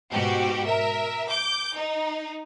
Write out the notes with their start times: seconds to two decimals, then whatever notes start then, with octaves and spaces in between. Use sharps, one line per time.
0.11 G#2 B2 F#4 G4
0.66 A#4 E5
1.28 D6 G6
1.75 D#4